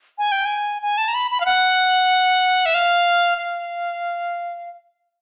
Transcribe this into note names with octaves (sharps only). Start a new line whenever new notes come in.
G#5
G5
G#5
G#5
A5
A#5
B5
B5
F5
F#5
E5
F5
F5